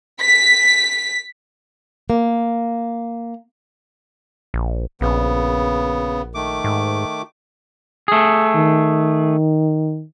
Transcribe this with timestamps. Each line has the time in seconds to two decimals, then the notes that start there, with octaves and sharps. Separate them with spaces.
0.21 B6
2.10 A#3
4.54 A#1
5.01 A#1 C#3 B3
6.35 D#3 A3 D6
6.64 G#2
8.08 A3 G#4
8.56 D#3